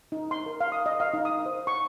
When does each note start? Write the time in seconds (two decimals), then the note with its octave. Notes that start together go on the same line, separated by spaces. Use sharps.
0.12 D#4
0.31 C6
0.46 A#4
0.61 F5
0.72 D#6
0.86 D#5
1.00 F5
1.13 D#4
1.25 D#6
1.46 C5
1.67 C#6